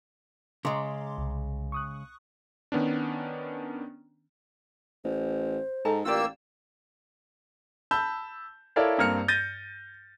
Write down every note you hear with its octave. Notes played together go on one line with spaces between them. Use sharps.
C#3 G#3 A#5 C6 D6
C2
C#6 D#6 F#6
D#3 B3 C#4 D4
A1 C5
G#2 A4 A5 A#5
A1 A#3 F4 G4 D5 E6
A5 B5 E6 G6
E4 A4 A#4 C#5 D5 F5
G2 A#3 C4 F6 C#7
G6 A6 A#6 D#7